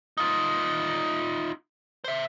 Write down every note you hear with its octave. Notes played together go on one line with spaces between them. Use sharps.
D#4 F4
C5 E5